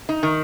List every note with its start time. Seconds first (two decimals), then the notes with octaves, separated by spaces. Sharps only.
0.09 D#4
0.23 D#3